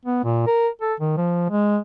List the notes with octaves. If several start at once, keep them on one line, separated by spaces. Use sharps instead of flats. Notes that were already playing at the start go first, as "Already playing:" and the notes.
B3
A#2
A#4
A4
D#3
F3
G#3